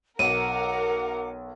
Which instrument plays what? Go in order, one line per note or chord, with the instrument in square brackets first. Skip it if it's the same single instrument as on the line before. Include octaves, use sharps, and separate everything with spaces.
[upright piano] B1 [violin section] A#4 [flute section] F#5 D6 [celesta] D#7